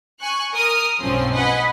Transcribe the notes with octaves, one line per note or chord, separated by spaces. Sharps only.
G#5 C#6 F#6
A#4 A#5 D#6 F6
B1 G2 F3 C4 C#4 C6
B4 D#5 F#5 G#5 B5